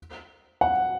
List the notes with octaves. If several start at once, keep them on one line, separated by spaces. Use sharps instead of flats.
F#5